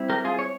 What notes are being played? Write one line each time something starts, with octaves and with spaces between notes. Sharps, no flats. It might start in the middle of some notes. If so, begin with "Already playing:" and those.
Already playing: G3 C4 E4
G4 A#4
F4 G#4
C#5